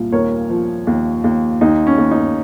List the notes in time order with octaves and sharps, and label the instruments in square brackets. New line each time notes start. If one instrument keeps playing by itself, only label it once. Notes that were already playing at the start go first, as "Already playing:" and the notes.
Already playing: [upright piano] C2 A#2
D#2 A#4 C#5
F3
D#2
D#2
D#2 D#4
C#4
D#2
D#4